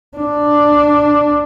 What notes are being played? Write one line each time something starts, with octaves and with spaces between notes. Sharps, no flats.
D4